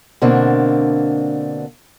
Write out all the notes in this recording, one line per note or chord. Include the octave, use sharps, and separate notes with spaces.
B2 D3 A#3 C4 D4